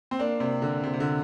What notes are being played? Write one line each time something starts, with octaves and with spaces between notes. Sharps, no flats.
C4
A#3 D4
C3
D3
C3
C3
D3